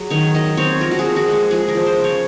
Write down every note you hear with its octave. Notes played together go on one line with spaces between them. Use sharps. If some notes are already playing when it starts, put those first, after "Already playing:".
Already playing: F#3 G#4
D#3 C#5
F#3 D#5
C4 C#5
F3 A#4
F#4
G#4
F3
F#4
G#3
G#4
F3 G#4
A#4
F3
C5
C#3
C#5